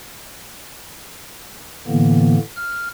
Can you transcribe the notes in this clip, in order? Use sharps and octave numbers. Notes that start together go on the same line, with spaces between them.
A2 D3 E3 A#3 B3
F6